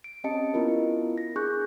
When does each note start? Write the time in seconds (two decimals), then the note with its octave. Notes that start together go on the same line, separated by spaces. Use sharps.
0.04 D7
0.24 C4 C#4 G4 D#5 A5 C#7
0.54 B3 E4 F4 A#4
1.18 A#6
1.36 D4 G#4 C#6 F#6 G6